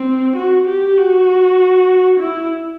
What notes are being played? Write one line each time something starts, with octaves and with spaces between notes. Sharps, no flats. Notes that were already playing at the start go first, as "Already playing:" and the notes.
Already playing: C4
F#4
G4
F#4
E4